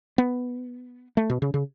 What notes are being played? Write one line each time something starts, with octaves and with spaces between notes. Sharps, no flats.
B3
A3
B2
C#3
C#3